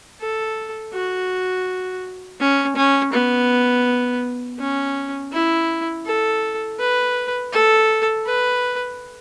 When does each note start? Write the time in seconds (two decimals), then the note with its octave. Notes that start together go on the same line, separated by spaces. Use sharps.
0.20 A4
0.94 F#4
2.40 C#4
2.76 C#4
3.13 B3
4.60 C#4
5.32 E4
6.06 A4
6.79 B4
7.53 A4
8.26 B4